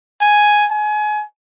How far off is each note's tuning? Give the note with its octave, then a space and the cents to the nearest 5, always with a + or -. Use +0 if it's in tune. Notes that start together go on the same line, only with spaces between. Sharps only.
G#5 +5
G#5 +30